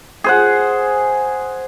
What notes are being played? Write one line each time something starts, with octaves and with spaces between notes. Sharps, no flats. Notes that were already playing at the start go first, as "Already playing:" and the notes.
G#4 C5 F#5